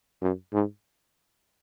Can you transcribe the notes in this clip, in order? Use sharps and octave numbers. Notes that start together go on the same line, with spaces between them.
F#2
G#2